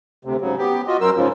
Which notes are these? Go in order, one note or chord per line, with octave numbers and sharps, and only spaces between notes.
D2 C3
G#2 C#3 F#3
B3 G4
F4 F#4 D#5
F#2 F#3 A#4 C5 E6
G#2 C#3 F3